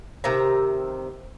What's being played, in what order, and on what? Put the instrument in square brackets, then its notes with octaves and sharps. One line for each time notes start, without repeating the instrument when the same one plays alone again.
[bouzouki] C3 D#3 E5 A#5